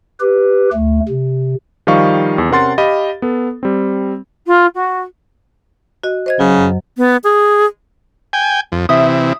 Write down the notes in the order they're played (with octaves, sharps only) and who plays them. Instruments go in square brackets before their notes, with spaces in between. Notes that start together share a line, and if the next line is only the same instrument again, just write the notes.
[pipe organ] G4 B4
D2 A3
C3
[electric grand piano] D#3 F3 G3 D#5 F5 C#6
E2
C3 C#4 A#4 F#5 C6 A6
G4 D#5 F5 B5
B3 A4
G3 C4
[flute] F4
F#4
[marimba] F#4 D#5
C5 D#5 G#6
[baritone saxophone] C#3 [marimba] F#3
[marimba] F#2
[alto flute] B3
G#4
[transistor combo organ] G5 G#5
F2
[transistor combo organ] C3 E3 [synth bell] E5 D#6